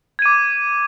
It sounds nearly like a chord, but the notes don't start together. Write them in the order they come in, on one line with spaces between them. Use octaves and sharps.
G#6 D#7 D6